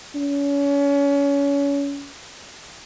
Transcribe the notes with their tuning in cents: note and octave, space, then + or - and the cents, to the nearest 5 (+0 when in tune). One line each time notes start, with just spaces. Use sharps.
C#4 +30